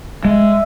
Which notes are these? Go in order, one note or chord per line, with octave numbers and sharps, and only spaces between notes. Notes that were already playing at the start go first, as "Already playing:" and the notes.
G#3 E5